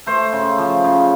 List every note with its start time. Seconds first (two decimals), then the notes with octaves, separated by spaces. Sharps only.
0.07 A3 C5
0.33 C#3
0.58 F3
0.84 C#3